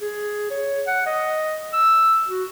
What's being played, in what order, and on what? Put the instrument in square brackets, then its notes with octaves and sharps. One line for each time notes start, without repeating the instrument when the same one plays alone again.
[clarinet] G#4
C#5
F#5
D#5
E6
F#4